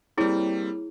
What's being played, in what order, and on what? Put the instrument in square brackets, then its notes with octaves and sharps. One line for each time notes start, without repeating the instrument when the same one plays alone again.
[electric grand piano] G3 A#3 C4 [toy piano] E4 G#4 C#5